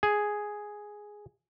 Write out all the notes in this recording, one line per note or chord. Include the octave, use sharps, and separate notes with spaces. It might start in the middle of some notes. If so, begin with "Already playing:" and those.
G#4